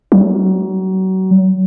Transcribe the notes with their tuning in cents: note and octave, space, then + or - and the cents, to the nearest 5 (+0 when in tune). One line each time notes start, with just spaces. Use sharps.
F#3 +30